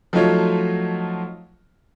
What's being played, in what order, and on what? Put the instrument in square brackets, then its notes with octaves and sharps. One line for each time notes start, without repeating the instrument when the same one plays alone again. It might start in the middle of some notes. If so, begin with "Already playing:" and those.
[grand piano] F3 F#3 A3 D#4 F4 C#5